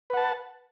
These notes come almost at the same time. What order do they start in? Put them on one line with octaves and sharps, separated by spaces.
B4 F#5 A5